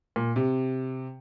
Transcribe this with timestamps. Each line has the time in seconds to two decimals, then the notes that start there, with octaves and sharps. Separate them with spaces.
0.16 A#2
0.36 C3